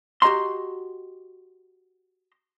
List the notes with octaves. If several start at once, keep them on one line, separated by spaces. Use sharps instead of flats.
F#4 G4 D#5 A#5 C6